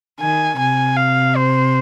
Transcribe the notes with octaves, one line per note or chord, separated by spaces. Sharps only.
D#3 G#5
C3 G#5
F5
C5